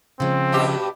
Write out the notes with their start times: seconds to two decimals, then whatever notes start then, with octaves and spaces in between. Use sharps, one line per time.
0.20 C#3 F3 G#3 C4
0.52 G2 B2 G4